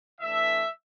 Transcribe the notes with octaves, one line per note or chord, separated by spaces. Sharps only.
E3 A3 D4 E5